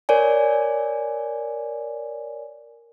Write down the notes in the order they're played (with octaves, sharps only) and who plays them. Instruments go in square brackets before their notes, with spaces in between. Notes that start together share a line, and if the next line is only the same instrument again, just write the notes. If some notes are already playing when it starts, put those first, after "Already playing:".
[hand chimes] A#4 C#5 D5 G#5